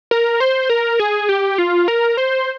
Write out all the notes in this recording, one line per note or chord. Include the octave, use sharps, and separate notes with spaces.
A#4
C5
A#4
G#4
G4
F4
A#4
C5